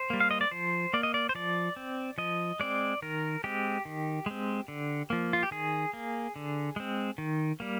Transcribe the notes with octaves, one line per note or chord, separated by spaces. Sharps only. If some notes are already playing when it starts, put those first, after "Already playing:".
Already playing: C5
G3 A#3
F5
D#5
D5
F3 C5
A#3 D5
D#5
D5
C5
F3 D5
C4
F3 D#5
G#3 C4 D5
D#3 A#4
G#3 C4 G4
D#3
G#3 C4
D3
F3 A#3
F4
G4
D#3 G#4
A#3
D3
G#3 C4
D#3
G3 A#3